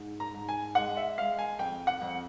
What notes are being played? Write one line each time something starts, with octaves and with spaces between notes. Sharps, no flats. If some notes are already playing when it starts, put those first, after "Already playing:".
Already playing: G#2
A#5
G#2
G#5
G#3 F#5
E5
G#3 F5
G#5
F2 G5
F#5
F2